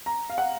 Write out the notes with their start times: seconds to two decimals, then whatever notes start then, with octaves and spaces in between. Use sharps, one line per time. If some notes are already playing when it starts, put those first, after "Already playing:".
0.06 A#5
0.30 F5
0.38 F#5